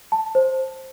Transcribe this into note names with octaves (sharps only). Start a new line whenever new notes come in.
A5
C5